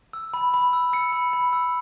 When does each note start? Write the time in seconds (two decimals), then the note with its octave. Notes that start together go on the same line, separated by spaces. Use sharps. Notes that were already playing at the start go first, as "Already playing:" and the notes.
0.13 E6
0.34 B5
0.54 B5
0.73 E6
0.93 E6 C#7
1.13 B5
1.33 B5
1.53 E6